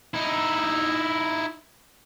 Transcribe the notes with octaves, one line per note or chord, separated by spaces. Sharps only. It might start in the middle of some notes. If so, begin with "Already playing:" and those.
D#4 E4